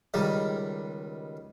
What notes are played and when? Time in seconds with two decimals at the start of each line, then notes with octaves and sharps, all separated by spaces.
0.14 C#2 D#3 G3